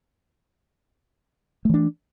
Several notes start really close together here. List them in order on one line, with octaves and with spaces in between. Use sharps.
A3 E3 D4